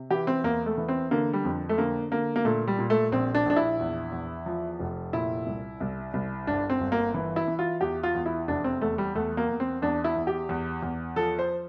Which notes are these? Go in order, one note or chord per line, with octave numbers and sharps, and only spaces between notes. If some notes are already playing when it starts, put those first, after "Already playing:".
Already playing: C3
E3 G4
C4
E2 A#3
A3
E3
C4
D3 A#3
G3
F2
A3
D3 A#3
D3 A#3
A#3
A#2 A3
G3
A#2
A3
A#1 C4
D4
A#1 D4
E4
E2
E2
F3
F1
A#2 E4
C2
C2
C2
G1 D4
C4
G1
A#3
E3
E4
E3
F4
E2 G4
F4
E2
E4
F1 D4
C4
E2 A3
G3
E2 A3
A#3
E2
C4
E2 D4
E4
E2
G4
E2
E2
F3 A4
C5